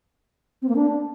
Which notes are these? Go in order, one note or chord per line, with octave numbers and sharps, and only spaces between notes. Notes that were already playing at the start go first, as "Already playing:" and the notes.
C4
A#3
D4